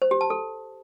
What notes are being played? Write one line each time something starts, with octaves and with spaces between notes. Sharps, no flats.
C5
G4
A5
A4